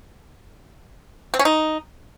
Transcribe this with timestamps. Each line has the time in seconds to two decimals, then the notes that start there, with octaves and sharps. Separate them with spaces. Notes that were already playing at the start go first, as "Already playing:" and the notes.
1.34 C4
1.39 C#4
1.45 D#4